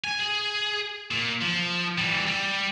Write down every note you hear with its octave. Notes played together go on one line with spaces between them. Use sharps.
G#5
G#4
A#2
F3
E3 G3
G3